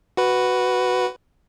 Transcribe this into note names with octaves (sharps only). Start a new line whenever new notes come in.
F#4 B4